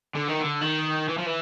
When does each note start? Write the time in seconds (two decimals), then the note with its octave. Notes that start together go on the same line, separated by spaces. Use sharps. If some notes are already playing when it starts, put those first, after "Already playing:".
0.15 D3
0.28 D#3
0.41 D3
0.62 D#3
1.08 E3
1.18 F3
1.26 E3